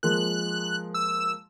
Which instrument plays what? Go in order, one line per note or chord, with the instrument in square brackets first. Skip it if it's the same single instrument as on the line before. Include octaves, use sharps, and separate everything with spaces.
[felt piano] F3 G#3 A#3 [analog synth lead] F#6
[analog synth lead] E6